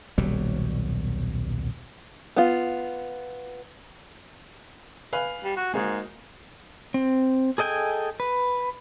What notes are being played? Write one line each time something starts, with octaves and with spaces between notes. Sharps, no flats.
D#1 B1 F#3 G3
B3 F4
B4 F5 G#5
G3
F#4
G#2 G#3 A#3 F#4
C4
G#4 A4 D#5 G5 G#5
B4